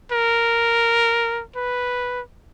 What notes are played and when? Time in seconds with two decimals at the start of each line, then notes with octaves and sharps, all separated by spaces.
0.12 A#4
1.56 B4